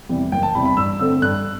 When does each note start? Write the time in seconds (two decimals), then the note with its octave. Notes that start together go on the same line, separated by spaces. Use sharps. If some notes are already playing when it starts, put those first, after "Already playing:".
0.09 E2 C3 E3 G3
0.32 F#1 G5
0.43 A5
0.55 E2 C3 E3 G3 B5
0.65 B5
0.77 G2 E6
0.99 D3 A3 C4 E6
1.22 G2 F#6